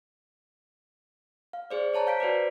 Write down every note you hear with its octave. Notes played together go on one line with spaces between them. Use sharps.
F5
G#4 C5 D5
C5 C#5 A5 A#5
F5 G6 B6 D7
F#4 B4 C5 D5